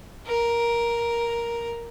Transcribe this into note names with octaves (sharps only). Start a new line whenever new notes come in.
A#4